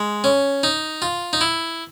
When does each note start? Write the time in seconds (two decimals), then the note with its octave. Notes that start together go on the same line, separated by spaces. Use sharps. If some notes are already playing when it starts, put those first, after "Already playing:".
Already playing: G#3
0.24 C#4
0.63 D#4
1.02 F4
1.33 D#4
1.41 E4